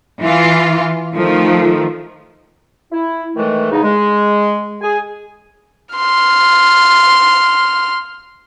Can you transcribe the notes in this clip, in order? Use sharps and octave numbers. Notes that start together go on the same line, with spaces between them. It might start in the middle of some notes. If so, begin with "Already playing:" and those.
E3 F4
D#3 F3 A3
E4
A2 D#3 E3 G#3 A3
E2 C#3 D#4
G#3
G#4 G#5
C6 F6